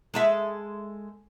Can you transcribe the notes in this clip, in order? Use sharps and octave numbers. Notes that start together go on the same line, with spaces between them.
G#3 A4 E5